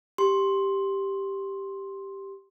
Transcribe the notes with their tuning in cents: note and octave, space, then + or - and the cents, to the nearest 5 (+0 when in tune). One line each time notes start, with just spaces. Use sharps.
G4 +0 C6 +10